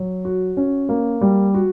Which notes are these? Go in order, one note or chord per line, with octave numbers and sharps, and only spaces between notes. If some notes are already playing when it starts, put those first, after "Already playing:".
Already playing: F#3
F#4
C#4
A#3
G3
F#4